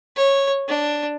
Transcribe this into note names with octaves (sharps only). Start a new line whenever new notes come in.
C#5
D4